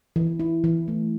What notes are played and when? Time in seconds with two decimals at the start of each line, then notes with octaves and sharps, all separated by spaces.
0.16 E3
0.40 E4
0.64 E3
0.88 A3